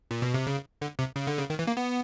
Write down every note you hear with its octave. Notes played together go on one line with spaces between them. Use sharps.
A#2
B2
C3
C#3
D3
C3
C#3
D3
C#3
D#3
E3
A#3
B3